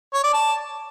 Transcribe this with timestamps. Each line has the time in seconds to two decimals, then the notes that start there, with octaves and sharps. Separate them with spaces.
0.14 C#5
0.24 D5
0.34 A5